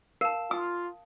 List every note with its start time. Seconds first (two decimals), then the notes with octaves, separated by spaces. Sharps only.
0.21 A#4 F5 A5
0.51 F4 D#6